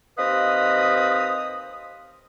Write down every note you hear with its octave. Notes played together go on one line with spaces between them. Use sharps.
D#2 C4 B4 D#5 F5 D#6